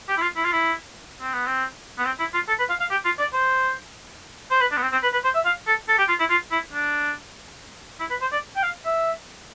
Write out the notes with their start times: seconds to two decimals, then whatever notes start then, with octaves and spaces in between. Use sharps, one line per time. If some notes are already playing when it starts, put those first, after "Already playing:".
0.08 G4
0.17 E4
0.22 F4
0.36 E4
0.44 F4
0.52 E4
1.21 C4
1.34 B3
1.46 C4
1.98 B3
2.05 C4
2.19 E4
2.34 F4
2.48 A4
2.59 B4
2.69 F5
2.80 F5
2.91 G4
3.05 F4
3.19 D5
3.33 C5
4.51 C5
4.61 B4
4.72 D4
4.77 B3
4.82 C4
4.92 C4
5.03 B4
5.13 B4
5.24 C5
5.35 E5
5.45 F5
5.67 A4
5.88 A4
5.98 G4
6.09 F4
6.20 E4
6.30 F4
6.52 E4
6.73 D4
8.00 E4
8.10 B4
8.21 C5
8.32 D5
8.56 G5
8.63 F5
8.86 E5